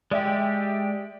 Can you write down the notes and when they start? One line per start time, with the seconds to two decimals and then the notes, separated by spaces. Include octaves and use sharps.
0.11 G#3 G4 D5 E5 G5